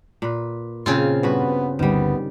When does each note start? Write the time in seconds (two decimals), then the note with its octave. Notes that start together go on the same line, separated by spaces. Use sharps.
0.22 A#2 B4
0.86 A#2 C#3 C4 F4
1.23 G2 B3 F#4 B4
1.79 G1 D2 D3 D#3 G3 B3